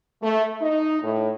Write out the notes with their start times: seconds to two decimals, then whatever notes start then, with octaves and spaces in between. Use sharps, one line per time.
0.21 A3
0.61 D#4
1.02 A2